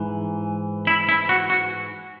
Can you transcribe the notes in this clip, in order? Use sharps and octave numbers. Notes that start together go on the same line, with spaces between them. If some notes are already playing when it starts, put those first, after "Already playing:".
Already playing: G#2 E3
E4
E4
F#4
F#4